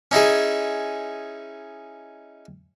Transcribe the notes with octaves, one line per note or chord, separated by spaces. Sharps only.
C#4 D#4 E4 G#4